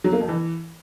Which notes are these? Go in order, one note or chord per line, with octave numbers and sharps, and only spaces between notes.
F#3
A#3
F2
E3